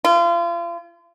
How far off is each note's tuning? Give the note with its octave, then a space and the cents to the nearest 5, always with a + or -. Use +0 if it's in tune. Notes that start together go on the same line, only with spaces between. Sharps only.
F4 -35